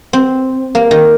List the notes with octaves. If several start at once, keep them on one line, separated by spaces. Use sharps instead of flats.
C4
A#3
D#3